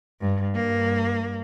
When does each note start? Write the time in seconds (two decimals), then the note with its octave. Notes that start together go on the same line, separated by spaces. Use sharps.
0.21 G2
0.55 G2 A#3